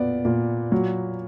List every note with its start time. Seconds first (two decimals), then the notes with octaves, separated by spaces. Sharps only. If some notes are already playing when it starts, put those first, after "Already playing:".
Already playing: A#2 B3 D5
0.25 A#2
0.72 F#3